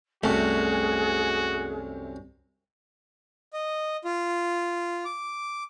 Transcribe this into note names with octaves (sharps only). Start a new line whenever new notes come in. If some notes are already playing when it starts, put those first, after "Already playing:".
C2 F#2 C3 A3 F#4 G#4
D#5
F4
D6